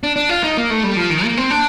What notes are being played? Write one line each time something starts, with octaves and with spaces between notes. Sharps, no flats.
D4
D4
F4
D#4
A#3
A3
G3
F3
D#3
A#3
C4
D4